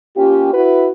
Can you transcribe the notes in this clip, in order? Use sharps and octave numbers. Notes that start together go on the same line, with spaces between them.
A#3 C#4 F4 G4
E4 F#4 B4